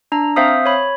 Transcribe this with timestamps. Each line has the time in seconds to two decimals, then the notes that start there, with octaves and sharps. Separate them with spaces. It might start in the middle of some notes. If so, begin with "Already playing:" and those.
0.12 D4 A#5
0.36 C4 C5 E5 F5 D#6
0.66 C#5 B5